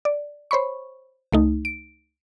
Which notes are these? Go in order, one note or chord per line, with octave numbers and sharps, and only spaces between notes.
D5
C5 C#5 B5 C#6
C#2 A3 D#4
D7